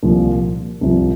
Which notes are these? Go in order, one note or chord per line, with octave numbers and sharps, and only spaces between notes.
C2 A#2 F3 A#3
C2 C3 F3